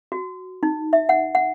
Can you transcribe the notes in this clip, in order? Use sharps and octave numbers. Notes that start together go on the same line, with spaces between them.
F#4
D#4
E5
F#5
F#5